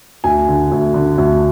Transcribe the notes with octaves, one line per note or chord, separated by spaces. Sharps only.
D2 G#5
D3
D2
D3
D2